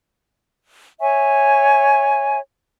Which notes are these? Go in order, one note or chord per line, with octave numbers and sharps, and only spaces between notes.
C#5 E5 G#5 C#6